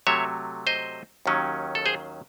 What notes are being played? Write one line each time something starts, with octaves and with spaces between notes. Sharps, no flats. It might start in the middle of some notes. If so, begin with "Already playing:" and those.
C3 F#3 A3 C#5 E5
C5 D#5
D#2 D#3 F#3 C#4
A4
G#4 C5